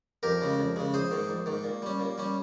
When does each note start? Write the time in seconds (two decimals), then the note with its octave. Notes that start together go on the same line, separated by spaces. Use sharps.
0.23 F2 G4 A#4
0.42 C#3 G#3
0.59 F2
0.76 C#3 G#3
0.94 A#1 G#4 C5
1.11 G#2 D#3
1.29 A#1
1.46 G#2 D#3
1.64 A#2
1.82 G3 C#4
2.00 A#2
2.18 G3 C#4